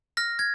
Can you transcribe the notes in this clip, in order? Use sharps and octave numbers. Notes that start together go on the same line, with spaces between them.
F6 A#6
G#6